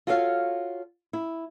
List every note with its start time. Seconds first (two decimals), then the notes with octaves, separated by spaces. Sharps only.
0.07 F4 F#4 A4 C#5 D#5 F5
1.13 E4